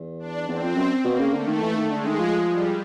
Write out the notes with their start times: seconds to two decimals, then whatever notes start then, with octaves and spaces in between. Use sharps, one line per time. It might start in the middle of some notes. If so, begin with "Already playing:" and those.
Already playing: E2
0.19 D4
0.47 E2 C4
0.62 F2
0.76 F#2
1.04 B2 A#3
1.19 C#3
1.33 D3 A3
1.47 D#3
1.62 E3
1.75 D#3
1.90 D3 G#3
2.05 D#3
2.19 F3
2.47 G3